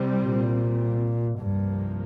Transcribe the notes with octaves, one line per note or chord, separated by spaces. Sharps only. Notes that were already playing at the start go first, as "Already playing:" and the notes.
Already playing: C2 C3 G3 C4
A#2
C2 G2 C3 F3 A#3